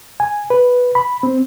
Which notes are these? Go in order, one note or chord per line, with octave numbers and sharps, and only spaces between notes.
G#5
B4
B5
C4